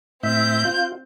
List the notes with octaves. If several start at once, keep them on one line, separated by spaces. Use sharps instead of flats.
A2 C4 E5 G6
F4